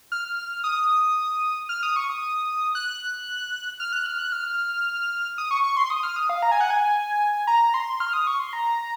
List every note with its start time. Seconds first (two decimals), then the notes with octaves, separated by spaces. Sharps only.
0.12 F6
0.64 D#6
1.69 F6
1.83 D#6
1.96 C#6
2.10 D#6
2.75 F#6
3.80 F6
3.92 F#6
4.06 F6
4.19 F#6
4.32 F6
5.38 D#6
5.51 C#6
5.64 C#6
5.77 C6
5.90 D#6
6.03 F6
6.16 D#6
6.29 F5
6.42 A#5
6.51 G#5
6.61 F#5
6.70 G#5
7.47 A#5
7.74 C6
8.00 F6
8.13 D#6
8.27 C#6
8.39 C6
8.53 A#5